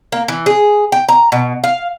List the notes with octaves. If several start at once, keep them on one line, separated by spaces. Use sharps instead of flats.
A#3
E3
G#4
G5
A#5
B2
F5